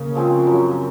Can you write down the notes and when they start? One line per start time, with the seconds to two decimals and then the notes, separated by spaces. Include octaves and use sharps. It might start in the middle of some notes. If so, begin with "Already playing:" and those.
Already playing: C#3 A#3
0.15 F3 G#3 C4
0.47 F#2